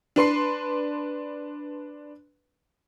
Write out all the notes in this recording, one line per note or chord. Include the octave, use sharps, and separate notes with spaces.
D4 B4 C6 C7